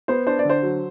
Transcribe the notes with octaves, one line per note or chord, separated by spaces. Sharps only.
B3 C5
D4 C5
D5
D3 C5
F#3